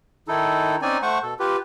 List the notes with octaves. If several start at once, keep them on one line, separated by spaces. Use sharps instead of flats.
D#3 D#4 E4 A4
C4 C#4 D#4 D5 G#5
A3 C5 F#5 C#6
B2 A4
F4 G4 B4